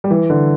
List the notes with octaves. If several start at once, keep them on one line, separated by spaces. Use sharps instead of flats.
G3
E3
D3